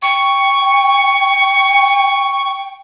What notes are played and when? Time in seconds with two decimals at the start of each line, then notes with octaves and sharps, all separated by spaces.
0.02 G5 C#6